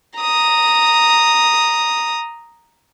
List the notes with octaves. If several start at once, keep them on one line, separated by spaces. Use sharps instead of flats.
A#5 D#6